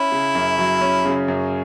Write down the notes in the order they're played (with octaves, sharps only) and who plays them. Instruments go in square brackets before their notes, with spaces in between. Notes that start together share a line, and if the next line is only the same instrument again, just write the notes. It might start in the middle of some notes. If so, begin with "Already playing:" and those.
Already playing: [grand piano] C#4 [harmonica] E4
[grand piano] C#3
F#2
F#3
C#4
C#3
F#2